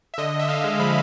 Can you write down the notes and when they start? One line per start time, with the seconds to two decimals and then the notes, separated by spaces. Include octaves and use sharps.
0.14 E5
0.18 D3 D#5
0.34 D3
0.39 E5
0.49 D3 F5
0.64 G#3
0.79 F3 B5